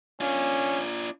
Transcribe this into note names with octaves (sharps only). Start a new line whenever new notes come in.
C#4 D4 F4